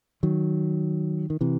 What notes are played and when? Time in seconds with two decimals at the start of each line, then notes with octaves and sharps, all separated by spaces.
0.23 D#3 F#3
1.30 D#3
1.41 C3 E3